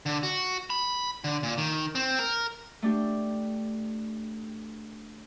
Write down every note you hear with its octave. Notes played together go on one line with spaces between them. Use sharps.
D3
F#4
B5
D3
A#2
D#3
C4
A#4
A3 D4 G4